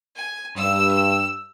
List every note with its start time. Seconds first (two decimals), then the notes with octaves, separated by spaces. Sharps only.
0.16 G#5
0.56 G2 E6